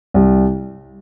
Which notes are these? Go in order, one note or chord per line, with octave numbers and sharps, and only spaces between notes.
C2